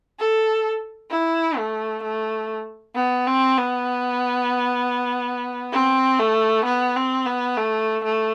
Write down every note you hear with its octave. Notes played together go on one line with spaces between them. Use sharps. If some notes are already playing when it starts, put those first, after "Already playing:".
A4
E4
A3
A3
B3
C4
B3
C4
A3
B3
C4
B3
A3
A3